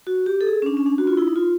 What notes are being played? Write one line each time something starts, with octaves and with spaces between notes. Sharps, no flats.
F#4
G4
A4
G#4
C#4
D4
C#4
D4
F#4
F4
E4
D#4
F4